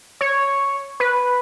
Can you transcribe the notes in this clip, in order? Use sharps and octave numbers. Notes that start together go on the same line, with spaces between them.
C#5
B4